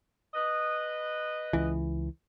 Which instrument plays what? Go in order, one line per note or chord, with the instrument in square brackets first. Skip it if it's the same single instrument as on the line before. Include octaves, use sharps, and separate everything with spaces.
[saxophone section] B4 D#5
[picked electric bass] C#2 E3